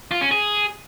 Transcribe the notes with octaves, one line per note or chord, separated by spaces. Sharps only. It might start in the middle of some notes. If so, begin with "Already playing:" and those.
F4
C#4
G#4